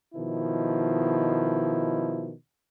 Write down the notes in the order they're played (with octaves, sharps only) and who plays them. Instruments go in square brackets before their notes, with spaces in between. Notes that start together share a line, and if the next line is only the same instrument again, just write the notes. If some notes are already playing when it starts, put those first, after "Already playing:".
[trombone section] B2 D#3 F3 E4